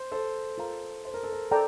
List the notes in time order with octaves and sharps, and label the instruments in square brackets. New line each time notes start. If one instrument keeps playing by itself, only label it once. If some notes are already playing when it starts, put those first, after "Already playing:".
Already playing: [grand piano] C5
A4 C5
[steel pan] F4 A#4 F5 A#5
[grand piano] C5
A#4
A4
A#4
[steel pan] A4 D5 G5 A#5